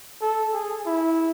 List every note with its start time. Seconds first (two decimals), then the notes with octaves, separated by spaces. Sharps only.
0.22 A4
0.54 G#4
0.86 E4